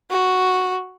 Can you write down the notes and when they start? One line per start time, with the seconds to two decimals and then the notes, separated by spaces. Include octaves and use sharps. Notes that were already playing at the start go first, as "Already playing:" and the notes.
0.11 F#4